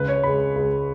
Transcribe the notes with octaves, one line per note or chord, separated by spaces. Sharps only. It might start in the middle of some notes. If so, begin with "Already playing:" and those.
Already playing: C#2 C#3 G#3 B4
C#5
C#2 C#3 G#3 B5
C#2 C#3 G#3